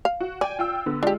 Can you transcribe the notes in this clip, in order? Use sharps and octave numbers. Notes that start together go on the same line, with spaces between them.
F5
F#4
D5 G5 G#5
F4 G5 E6
D3 B3
G#3 D4 F4 G4